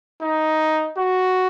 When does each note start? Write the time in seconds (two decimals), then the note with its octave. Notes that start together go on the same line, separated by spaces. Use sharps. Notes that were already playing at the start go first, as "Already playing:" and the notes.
0.21 D#4
0.97 F#4